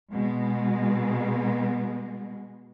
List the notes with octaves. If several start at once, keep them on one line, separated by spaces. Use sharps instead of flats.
B2 G#3